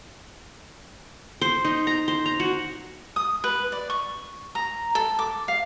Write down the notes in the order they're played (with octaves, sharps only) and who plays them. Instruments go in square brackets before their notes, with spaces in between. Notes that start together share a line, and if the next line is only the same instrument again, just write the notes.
[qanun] C5
D#4
A#5
C5
A#5
F#4
[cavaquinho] D#6
B4
D5
C#6
A#5
A4
D6
F5